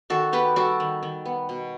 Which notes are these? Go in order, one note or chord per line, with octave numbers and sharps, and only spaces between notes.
D#3 F#4 A4
B3 G4 B4
G3 F#4 A4
D#3
D#3
B3
B2